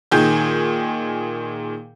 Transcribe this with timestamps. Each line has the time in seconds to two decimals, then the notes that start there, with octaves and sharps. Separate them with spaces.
0.12 A#2 D#3 G#4 G6